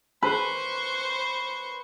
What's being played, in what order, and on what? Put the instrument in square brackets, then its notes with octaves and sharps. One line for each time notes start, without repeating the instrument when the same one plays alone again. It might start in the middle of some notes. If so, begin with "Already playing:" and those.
[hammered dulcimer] B4 [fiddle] C5 C#6